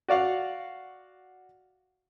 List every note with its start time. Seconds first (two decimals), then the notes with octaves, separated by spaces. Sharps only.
0.08 F#4 D5 F5 F#5